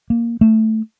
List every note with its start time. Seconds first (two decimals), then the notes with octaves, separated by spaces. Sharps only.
0.10 A#3
0.41 A3